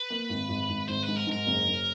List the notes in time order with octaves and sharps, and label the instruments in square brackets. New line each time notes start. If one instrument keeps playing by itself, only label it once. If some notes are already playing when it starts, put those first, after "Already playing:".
Already playing: [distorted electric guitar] B4
[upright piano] A#3
G#1
G#1
G#1
[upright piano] G#1 [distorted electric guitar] C5
[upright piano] G#2 [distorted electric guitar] B4
[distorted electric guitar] A#4
[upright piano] G#2 [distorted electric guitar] A#4
[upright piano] F#1
F#2